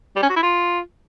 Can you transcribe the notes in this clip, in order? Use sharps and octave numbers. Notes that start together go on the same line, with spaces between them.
G3
C#4
F#4
E4
F4